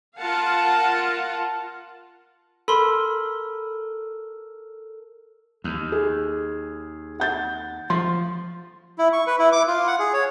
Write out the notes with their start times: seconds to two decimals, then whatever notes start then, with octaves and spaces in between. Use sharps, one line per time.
0.18 F4 A#4 F5 F#5 A5
2.68 A4 A#4 B5 C6
5.64 D#2
5.92 G#4
7.20 F#5 G6 A6
7.90 F3 C6
8.98 E4
9.13 C#6
9.27 B4
9.39 E4
9.52 D6
9.67 F4
9.87 F#5
9.99 G#4
10.13 C#5